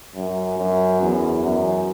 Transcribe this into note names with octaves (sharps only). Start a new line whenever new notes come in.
F#2
F#2
E2
F#2